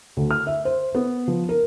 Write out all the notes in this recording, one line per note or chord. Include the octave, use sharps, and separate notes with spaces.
D2
F6
E5
C5
B3
F3
A#4